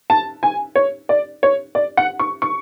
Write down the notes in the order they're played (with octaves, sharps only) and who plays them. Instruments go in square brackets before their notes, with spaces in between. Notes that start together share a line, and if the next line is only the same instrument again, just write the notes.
[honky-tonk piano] A5
G#5
C#5
D5
C#5
D5
F#5
C#6
C#6